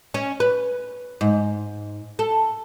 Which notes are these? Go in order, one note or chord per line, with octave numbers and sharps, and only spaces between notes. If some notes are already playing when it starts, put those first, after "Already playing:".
C#4
B4
G#2
A4